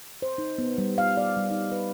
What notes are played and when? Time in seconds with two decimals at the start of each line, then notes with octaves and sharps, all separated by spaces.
0.22 C5
0.38 D#4
0.58 B3
0.78 G3
0.98 F5
1.17 D5
1.37 G3
1.51 D#4
1.71 B4